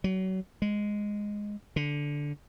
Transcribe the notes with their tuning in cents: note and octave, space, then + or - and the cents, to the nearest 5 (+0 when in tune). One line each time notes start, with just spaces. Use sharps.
F#3 +30
G#3 -5
D3 -5